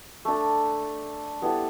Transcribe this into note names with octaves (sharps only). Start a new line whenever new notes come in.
A3 D4 A4
G3 B3 E4 A4